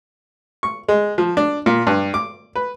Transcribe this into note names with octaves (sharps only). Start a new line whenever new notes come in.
C#6
G#3
F3
D4
A#2
G2
D6
B4